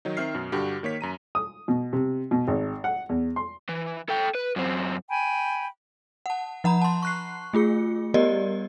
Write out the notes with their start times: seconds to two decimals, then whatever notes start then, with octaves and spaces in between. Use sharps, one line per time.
0.05 D#3 F#3 D#4
0.17 D#3 C4 E5 F6 C7
0.34 F#2 B2
0.52 G2 D3 F#4 G4
0.83 D#3 A#3 C#5 B6
1.01 F#2 A#5 D#7
1.35 D#6
1.68 B2
1.93 C3
2.31 B2
2.48 G#1
2.84 F#5
3.09 E2
3.36 C6
3.69 E3
4.09 A4 G5
4.35 B4
4.56 F#2 C4
5.09 G5 G#5 B5
6.26 F#5 A5
6.64 F3 F#5 A#5 B5
6.82 A5 C6
7.03 C#6 F#6 C7
7.53 A3 F4 G#4 C#7
8.14 G3 B3 G4 A#4 D5 D#5